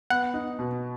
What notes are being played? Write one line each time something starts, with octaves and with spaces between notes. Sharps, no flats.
B3 F#5
D#4
B2